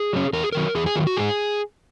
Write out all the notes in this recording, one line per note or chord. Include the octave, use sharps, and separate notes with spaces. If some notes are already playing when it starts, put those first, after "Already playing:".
Already playing: G#4
F#3 C#4
E2 A#4
G#4
D#3 F#3 A#4
E2 G#4
G#4
D#3 F#3 F#4
F#4
G#2 G#4